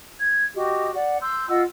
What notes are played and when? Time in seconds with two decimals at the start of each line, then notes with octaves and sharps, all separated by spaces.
0.19 G#6
0.56 F#4 G4 D#5
0.94 D5 F#5
1.21 C6 E6 G6
1.49 F4 D#5 F#5 E6